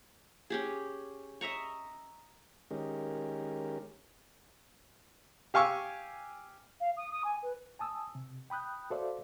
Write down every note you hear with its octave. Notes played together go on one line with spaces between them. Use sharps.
C#4 G4 G#4
D#5 E5 A#5 C#6
D#3 G#3 C#4 G4 A#4
G4 F5 G#5 C#6 E6
F5
D#6
D#6
G#5
B4
G#5 A5 D#6 E6
C3
G5 B5 D#6 F#6 G6
F#4 A4 C5 D5 E5 F5